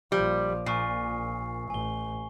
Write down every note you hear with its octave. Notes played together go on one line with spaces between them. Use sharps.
A#1 F3 G3
A#1 A#2 G#5 C#6 C7
A1 G#5 G7